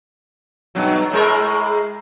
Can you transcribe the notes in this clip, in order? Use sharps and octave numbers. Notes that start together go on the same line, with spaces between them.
G2 B2 F#3
A2 G#3 A#4